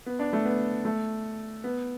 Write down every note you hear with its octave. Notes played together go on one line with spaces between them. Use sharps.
B3
D4
A3
B3
A3
B3